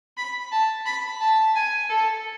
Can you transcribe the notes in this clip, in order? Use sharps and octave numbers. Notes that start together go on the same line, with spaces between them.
B5
A5
B5
A5
G#5
A4